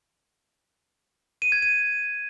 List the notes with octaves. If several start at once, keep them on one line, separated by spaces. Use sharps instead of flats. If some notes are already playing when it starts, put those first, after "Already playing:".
D#7
G#6
D#7